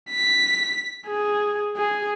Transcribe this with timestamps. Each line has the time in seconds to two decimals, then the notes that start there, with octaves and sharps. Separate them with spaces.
0.11 B6
1.07 G#4
1.77 G#4